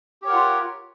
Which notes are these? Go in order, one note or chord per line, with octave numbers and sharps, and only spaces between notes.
F4 G4 A#4 C#5 F#5